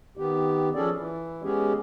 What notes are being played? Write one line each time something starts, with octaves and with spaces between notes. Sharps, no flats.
D#3 B3 G4
F3 C#4 G#4 A4 D5
E3
G#3 B3 C#4 G4 G#4